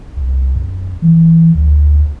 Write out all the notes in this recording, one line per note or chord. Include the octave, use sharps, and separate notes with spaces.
C2
F#2
E3
D2